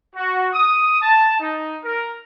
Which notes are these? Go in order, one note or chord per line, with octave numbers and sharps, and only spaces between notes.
F#4
D#6
A5
D#4
A#4